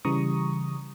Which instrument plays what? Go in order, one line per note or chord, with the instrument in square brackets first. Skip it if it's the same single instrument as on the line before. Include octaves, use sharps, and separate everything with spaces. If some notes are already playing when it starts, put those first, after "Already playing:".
[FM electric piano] C#3 E3 G3 A#5 C#6 D#6